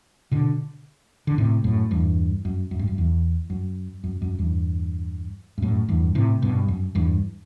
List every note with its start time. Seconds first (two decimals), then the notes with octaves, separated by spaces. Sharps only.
0.31 B2 D3
1.27 D3
1.38 A2 C3
1.64 F#2 A2
1.91 E2 G2
2.45 F#2
2.71 F#2
2.79 G2
2.87 F#2
2.98 E2
3.50 F#2
4.04 F#2
4.22 F#2
4.39 E2 G2
5.58 G2
5.62 F#2 A2
5.88 E2 G2
6.15 A2 C3
6.42 G2 B2
6.68 F#2
6.95 E2 G2